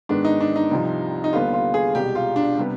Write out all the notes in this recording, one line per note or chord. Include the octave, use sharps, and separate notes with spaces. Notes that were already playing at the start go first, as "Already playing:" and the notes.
G#2 D#3 B3 D4
D#4
D4
D#4
C2 C3 F3
D#4
D#2 D3 G3 B3 F4
F4
G#4
C2 B2 G#3 G4
F4
D4
C3 G3 B3